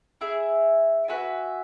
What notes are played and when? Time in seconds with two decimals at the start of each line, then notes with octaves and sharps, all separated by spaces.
0.21 E4 G#4 E5
1.08 F#4 B4 E5 G#5